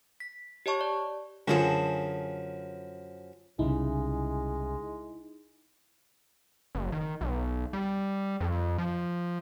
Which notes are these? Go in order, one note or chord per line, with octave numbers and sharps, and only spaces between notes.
B6
G4 C#5 D#5 A5 C#6
D5
F#2 D3 F3 G#4 A4
C2 C#3 G#3 D#4 E4
F#1
D#3
B1
G3
F2
F3